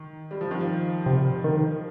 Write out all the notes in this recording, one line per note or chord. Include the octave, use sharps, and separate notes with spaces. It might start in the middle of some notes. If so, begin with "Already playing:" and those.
Already playing: D#3
G3
F3
D#3
F3
C3
D#3